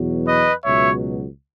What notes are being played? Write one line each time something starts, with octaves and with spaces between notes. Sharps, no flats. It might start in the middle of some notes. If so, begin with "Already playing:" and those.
Already playing: E2 B2 F#3
B4 D#5
C#2 B2 F#3 C#5 E5